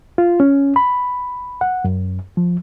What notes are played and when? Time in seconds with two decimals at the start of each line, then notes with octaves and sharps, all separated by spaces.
0.18 F4
0.40 C#4
0.76 B5
1.61 F#5
1.84 F#2
2.37 F3